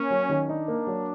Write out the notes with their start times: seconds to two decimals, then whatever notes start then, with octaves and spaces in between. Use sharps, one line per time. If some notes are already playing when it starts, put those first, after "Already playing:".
Already playing: A#3 C#4
0.10 F#3
0.29 D#3
0.49 D4 D#4
0.68 A#3
0.87 F#3